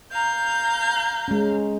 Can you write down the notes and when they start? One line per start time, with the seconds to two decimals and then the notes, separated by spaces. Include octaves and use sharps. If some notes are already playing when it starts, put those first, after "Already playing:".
0.12 F5 A#5 G6
1.28 G#3 C#4